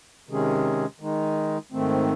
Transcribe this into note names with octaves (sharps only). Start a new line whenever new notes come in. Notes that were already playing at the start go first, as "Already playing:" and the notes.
C3 D#3 G#3 C#4 G#4
D#3 G#3 D#4
G#2 D#3 A3 C4